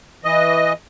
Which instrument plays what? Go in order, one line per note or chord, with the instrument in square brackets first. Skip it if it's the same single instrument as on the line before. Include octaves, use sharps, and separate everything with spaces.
[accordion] E3 D#5